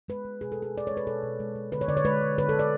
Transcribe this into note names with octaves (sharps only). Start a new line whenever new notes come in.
G#3 B4
G#3
B2 G#4
A4
B2 G#4
G#3 D5
G#3 C#5
B4
B2 A4
B2
G#3
G#3
D3 B4
C#5
D3 D5
C#5
G#3 B4
G#3
D3 B4
A4
D3
D5